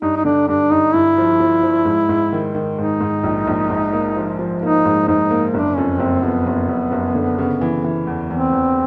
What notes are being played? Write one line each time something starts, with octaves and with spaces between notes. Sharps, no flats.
G2 D#4
D#4
D3 D4
G2 D4
G2 D#4
G2 E4
F3
F3
F3
G#2
G#2
D#3
D#3
G#2 D#4
G#2
A#1
A#1
G#2
A#3
F3
F3
A#3 D#4
G#2
G#2 D#4
A#3
F#1 D4
F2 C#4
F#1 C4
F2 B3
F#1
F#1
F#1
D3
C#3
E3
E3
E2
E2 C4
E2